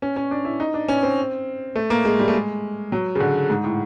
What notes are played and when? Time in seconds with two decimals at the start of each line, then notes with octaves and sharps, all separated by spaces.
0.02 C#4
0.16 C#4
0.31 D4
0.45 E4
0.60 D#4
0.74 D4
0.88 C#4
1.03 C4
1.75 A3
1.90 A#3
2.05 G#3
2.19 G3
2.28 A3
2.33 G#3
2.92 F#3
3.15 C#3
3.20 D3
3.50 G#2
3.64 A2